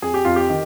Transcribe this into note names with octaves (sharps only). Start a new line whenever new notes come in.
F2 G#4
G4
F2 F4
G4
D#3